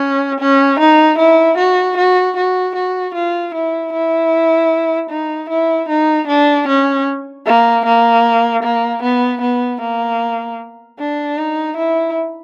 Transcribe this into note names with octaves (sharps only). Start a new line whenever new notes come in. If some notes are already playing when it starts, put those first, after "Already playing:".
Already playing: C#4
C#4
D#4
E4
F#4
F#4
F#4
F#4
F4
E4
E4
D#4
E4
D#4
D4
C#4
A#3
A#3
A#3
B3
B3
A#3
D4
D#4
E4